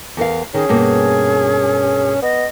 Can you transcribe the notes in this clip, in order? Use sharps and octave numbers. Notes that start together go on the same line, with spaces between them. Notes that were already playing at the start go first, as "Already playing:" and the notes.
E2 A#4 F5
D#3 C#4 G#4
G2 B2 A#3
B3 D#5